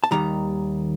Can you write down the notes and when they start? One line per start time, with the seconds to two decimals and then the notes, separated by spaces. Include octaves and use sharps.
0.04 A5
0.11 D#2 D#3 G3 A#5